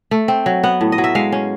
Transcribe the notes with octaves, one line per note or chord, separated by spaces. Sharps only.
A3
C4
F#3
B3 F#5
A2
D#5
F#3
E5
G#3 F5
C#4